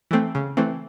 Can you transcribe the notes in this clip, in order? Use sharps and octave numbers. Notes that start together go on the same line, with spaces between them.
E3 A3 C4
C#3
E3 A3 C4